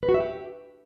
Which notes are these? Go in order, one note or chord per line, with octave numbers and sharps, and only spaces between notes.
B4
F#4
E5
G4